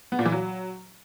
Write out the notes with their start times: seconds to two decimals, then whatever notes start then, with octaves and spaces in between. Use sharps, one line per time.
0.12 B3
0.19 A#2
0.25 E3
0.32 F#3